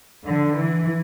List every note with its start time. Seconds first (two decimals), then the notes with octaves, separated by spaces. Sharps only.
0.25 D3
0.54 E3